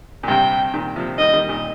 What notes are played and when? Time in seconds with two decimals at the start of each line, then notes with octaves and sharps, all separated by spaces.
0.23 A#2
0.28 G2 C3 G5
0.73 A#2 D#3
0.96 C3 F3
1.18 D#3 G3 D#5
1.33 D#3 G3
1.49 A#2 D#3